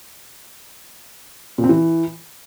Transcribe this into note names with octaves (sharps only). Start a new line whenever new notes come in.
A#2
C4
E3